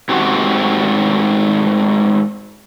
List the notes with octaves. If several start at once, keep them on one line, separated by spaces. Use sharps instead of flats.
G#2 A3 C4 F#4 G4 F#5